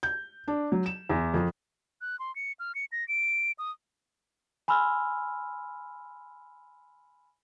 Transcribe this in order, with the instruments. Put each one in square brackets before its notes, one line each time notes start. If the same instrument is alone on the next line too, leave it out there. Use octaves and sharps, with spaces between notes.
[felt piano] G6
D4
F#3
E7
E2
F2
[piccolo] F#6
C6
C#7
F6
C#7
A#6
D7
D#6
[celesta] G#5 B5 C6 E6 F6